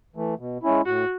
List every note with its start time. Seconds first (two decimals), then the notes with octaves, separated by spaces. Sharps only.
0.16 E3 A3
0.39 B2
0.63 G#3 C#4 E4
0.86 A2 F#4